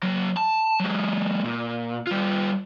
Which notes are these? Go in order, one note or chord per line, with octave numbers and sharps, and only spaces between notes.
F#3 A#3
A5
F#3 G#3
A#2
G3 F4